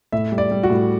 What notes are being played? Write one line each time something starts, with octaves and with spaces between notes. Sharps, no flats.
A2 E5
G3
D5
G3
F#4
A2